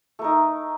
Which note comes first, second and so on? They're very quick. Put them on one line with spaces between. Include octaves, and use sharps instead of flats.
A3 A#4 D#4